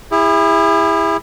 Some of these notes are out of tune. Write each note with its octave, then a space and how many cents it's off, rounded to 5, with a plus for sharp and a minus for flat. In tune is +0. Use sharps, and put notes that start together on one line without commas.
E4 +0 G#4 -40